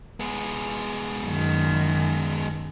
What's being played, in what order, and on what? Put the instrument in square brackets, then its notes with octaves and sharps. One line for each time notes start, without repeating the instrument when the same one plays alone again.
[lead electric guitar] G#3 B3
[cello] F#2 D#3